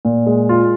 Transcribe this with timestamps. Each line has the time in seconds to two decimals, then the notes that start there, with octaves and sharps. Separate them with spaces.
0.05 A#2
0.26 G#3
0.49 F4